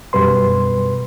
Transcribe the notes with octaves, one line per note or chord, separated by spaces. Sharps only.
F#2 B2 G3 B4 C6